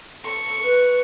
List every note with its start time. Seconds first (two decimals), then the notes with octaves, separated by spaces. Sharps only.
0.25 A4 C#6
0.62 B4